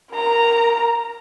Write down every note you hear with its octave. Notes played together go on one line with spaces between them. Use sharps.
A#4 A#5